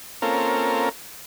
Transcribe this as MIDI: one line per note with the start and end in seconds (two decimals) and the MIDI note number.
0.22 0.89 58
0.22 0.89 60
0.22 0.89 61
0.22 0.89 65
0.22 0.89 69
0.22 0.89 70